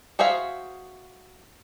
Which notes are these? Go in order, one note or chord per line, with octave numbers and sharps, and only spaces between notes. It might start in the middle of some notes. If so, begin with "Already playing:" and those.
F#4 G#4 C5 E5 F5